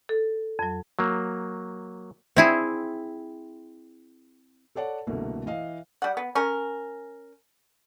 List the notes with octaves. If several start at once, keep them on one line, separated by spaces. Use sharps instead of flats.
A4
F2 F#3
F#3 A#3
C4 E4 G#4
A4 C#5 D5 F#5 A5
C2 B2 D3 A3 A#3
E3 D#5 F5
G3 F#5
B3
C#4 A#4